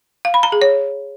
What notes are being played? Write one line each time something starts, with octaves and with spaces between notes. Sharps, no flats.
F5
B5
A#5
G#4
C#5